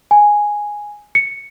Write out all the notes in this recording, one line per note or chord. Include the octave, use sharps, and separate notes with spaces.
G#5
C#7